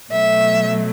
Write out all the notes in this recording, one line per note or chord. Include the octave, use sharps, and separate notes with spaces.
B2 F#3 A3 E5